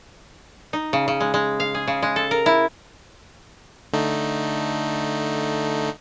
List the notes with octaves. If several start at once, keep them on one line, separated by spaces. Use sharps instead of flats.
D#4
C#3
C#3
G#3
G#3
F5
G#4
C#3
G#3
A4
A#4
E4
D3 A3 D#4